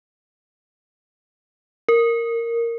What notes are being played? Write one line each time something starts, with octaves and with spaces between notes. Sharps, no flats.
A#4